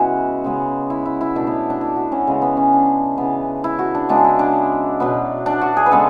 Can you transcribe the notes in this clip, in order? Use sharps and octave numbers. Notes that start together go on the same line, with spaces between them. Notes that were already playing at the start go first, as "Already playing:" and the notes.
Already playing: C#3 G#3 B3 E4 F#4
C#3 G#3 B3
E4
E4
E4
B2 F#3 A3 D4
B3
D4
E4
F#4
C#4
C#3 G#3 B3
B3
C#4
D4
C#3 E3 B3
E4
F#4
D4
C#3 G#3 B3 D4
E4
D4
B2 F#3 B3
D4
F#4
G#4
B4
C#3 G#3 B3 A4